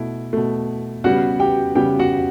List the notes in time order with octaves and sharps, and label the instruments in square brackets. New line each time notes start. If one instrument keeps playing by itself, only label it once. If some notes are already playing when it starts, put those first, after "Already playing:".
Already playing: [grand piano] B2 A3 E4
B2 A3
C#3 G3 B3 F#4 F#5
G4 G5
C#3 G3 B3 G4 G5
F#4 F#5